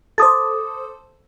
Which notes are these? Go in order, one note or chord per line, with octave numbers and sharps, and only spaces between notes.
A4 C5 D6 D#6 A6